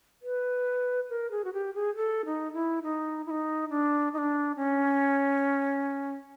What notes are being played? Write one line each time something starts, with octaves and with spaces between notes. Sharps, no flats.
B4
A#4
G#4
F#4
G4
G#4
A4
D#4
E4
D#4
E4
D#4
D4
D#4
D4
C#4